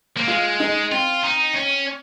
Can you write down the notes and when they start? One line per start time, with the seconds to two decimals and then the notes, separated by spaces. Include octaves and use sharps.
0.17 A#3
0.28 G#3 F4
0.60 D#4
0.91 C4 F4
1.24 D#4
1.56 C#4